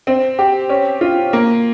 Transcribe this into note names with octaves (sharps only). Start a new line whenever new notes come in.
C4
G4
C#4
F4
A#3